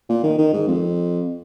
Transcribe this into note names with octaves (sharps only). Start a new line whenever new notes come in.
A#2
D#3
D#3
G#2
F2